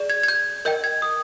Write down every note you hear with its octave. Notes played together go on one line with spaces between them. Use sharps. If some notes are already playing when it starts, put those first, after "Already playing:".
Already playing: G#4 D5
G#6
G#6
G6
A#4 D#5 G5 G6
G#6
D#6